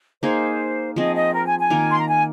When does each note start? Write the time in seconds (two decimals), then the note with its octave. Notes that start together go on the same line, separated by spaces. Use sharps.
0.22 A#3 D#4 G#4 C5
0.96 F3 C4 G#4 D#5
1.15 D#5
1.34 A#4
1.46 G#5
1.58 G#5
1.70 D#3 A#3 F4 A#4
1.90 C6
1.99 A#5
2.08 G#5